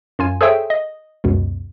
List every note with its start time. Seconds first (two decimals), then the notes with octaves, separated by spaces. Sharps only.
0.19 F#2 F4 G#5
0.41 G#4 A4 C5 C#5 E5 G5
0.70 D#5
1.24 C#2 F#2 B2